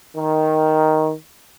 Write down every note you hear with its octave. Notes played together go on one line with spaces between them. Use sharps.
D#3